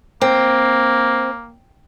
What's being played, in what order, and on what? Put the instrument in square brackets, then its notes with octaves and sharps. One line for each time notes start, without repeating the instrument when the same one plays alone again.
[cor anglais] A#3 [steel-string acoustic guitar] C4